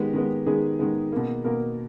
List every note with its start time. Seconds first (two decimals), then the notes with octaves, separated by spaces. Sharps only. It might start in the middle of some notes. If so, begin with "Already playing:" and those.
Already playing: D#3 G#3 B3 G4
0.14 D#3 G#3 B3
0.46 D#3 G#3 B3 G#4
0.79 D#3 G#3 B3
1.12 B2 A#3
1.44 B2 A#3 A#4